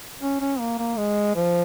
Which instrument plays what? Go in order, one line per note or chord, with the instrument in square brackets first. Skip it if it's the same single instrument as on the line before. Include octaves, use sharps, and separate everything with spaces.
[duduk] C#4
C#4
A#3
A#3
G#3
F3